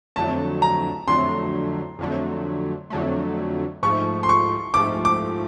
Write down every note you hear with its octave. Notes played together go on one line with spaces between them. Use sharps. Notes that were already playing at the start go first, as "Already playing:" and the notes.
F2 D3 F#3 A3 A5
A#5
F2 D3 F#3 A3 C6
F2 D3 F#3 A3
F2 D3 F#3 A3
G#2 F3 A3 C#6
C6
C#6
G#2 F3 A3 D6
D6